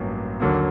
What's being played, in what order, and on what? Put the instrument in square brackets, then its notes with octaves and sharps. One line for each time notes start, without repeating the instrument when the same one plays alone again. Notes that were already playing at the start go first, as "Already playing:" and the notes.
Already playing: [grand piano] A1 G2 F#3 A#3
D#2 D3 F#3 A#3